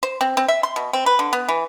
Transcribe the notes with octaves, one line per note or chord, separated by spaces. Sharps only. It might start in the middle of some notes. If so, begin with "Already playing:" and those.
C5
C4
C4
E5
C6
B2
C4
B4
D3
B3
E3